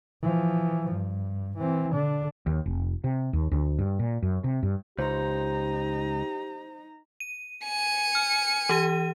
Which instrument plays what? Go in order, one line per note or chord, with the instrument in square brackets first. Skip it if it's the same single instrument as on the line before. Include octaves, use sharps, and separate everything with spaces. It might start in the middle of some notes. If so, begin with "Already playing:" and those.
[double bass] E3 F3
G2
E3 C4
D3 D4
[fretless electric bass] D#2
F1
C3
D#2
D2
G2
A#2
F#2
C3
G2
[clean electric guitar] C#2 [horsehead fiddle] D#4 A#5 [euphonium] G4 [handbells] C5
[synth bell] D#7
[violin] G#5 C#7
[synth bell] F6
E3 G4 D#7